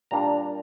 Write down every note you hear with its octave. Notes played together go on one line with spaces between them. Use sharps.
A#2 G3 A#3 D4 A#5